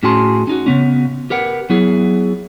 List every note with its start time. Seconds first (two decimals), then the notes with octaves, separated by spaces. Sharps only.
0.03 A2 C#4 F#4 G#4 A5 C6
0.47 C#4 D#4 F#4
0.66 C#3 B3 C#4
1.30 G4 A#4 B4 F#5
1.70 F#3 B3 E4 G#4